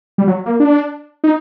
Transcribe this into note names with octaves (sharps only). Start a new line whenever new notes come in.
G3
F#3
A#3
D4
D#4